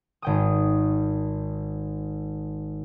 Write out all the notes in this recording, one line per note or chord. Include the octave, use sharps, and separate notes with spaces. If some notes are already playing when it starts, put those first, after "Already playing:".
G#1 G5 D#6